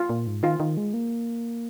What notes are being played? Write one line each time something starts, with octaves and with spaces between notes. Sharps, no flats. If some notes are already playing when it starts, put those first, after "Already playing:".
Already playing: F4
A#2
G#2
D#3 F4
D#3
G#3
A#3